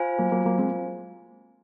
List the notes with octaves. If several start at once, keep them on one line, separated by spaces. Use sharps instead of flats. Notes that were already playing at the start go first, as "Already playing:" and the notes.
Already playing: F4 C5 F5 G#5
F#3 A#3
F#3 A#3
F#3 A#3
G#3 C4